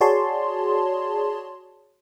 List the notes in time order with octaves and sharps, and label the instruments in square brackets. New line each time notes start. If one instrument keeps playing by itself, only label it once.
[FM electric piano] F#4 G#4 C#5 D5 A5 C6